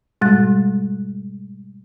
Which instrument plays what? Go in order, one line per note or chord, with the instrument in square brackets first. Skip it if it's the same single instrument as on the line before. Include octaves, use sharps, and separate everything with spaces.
[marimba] G#2 B2 G3 G#3 F#6 A6